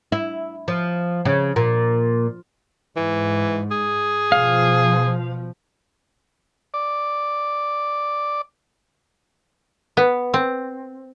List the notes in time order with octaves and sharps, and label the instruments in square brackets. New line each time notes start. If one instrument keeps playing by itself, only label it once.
[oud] E4
F3
C#3
A#2
[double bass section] G#2 [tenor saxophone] E3
[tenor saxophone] G#4
[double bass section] B2 F3 [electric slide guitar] F5
[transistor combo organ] D5 D6
[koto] B3
C4